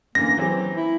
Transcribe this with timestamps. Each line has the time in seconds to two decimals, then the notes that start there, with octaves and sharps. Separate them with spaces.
0.15 F#2 D3 E3 A#3 A#6
0.38 E3 F#3 C4 G4
0.77 E4